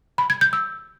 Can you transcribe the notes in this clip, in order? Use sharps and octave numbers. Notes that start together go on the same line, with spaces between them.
B5
G#6
G6
E6